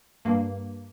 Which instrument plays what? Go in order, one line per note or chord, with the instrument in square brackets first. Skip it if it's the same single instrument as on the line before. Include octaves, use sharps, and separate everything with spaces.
[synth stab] G2 A#3